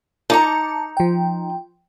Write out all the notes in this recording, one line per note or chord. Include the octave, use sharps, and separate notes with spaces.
D#4 A5 A#5 D6 C#7
F3 G5